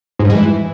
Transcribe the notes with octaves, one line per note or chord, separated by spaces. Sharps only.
G#2
G2
G#3
E3